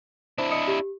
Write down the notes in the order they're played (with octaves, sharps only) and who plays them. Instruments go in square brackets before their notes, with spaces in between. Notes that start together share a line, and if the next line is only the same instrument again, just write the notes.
[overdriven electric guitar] D4 E4 [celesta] C5
[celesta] D#5 D#6 C#7
G4